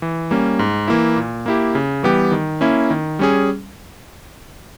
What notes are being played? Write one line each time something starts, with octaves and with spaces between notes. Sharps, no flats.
E3
G3 A#3 C#4
G#2
E3 A#3 E4
A#2
A#3 E4 G4
C#3
E3 G3 B3 G4
D#3
A#3 C#4 E4
D#3
G3 C#4 G#4